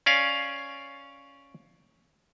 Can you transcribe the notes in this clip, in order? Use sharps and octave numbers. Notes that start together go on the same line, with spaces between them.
C#4 D5 F5 G#5